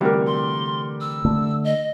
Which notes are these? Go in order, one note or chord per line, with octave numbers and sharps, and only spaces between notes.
D2 C3 E3 G3 G4 A#4
C6
E6
D3 A3
D#5